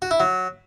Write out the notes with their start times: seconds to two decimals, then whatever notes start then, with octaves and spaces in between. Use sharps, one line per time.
0.02 F#4
0.11 E4
0.20 F#3